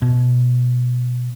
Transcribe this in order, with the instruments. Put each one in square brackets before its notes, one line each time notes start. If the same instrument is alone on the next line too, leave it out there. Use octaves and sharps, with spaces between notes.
[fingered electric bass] B2